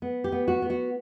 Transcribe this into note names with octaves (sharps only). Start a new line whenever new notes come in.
B3
G4
B3
F#4
B3
F#4